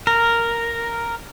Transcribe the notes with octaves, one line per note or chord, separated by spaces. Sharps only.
A#4